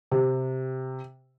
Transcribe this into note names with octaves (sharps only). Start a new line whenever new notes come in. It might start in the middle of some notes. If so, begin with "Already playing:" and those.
C3